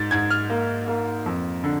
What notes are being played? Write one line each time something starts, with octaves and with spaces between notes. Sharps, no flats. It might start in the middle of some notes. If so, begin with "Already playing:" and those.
Already playing: G#2 A6
G#2 G#6
F6
A#3
A#3
F2
D3